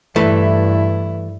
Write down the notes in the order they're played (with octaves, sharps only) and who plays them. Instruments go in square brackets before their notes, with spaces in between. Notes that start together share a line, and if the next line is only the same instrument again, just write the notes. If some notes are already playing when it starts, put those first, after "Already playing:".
[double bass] G2 E4 [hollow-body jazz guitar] E3 A3